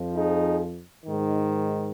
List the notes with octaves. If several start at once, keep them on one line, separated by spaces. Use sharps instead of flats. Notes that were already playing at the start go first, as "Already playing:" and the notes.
Already playing: F2 F3
D#4 G#4
G#2 D#3